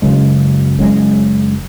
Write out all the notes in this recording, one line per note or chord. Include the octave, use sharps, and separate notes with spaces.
F#1 F#2 C#3 G#3
F#1 F#2 C#3 G#3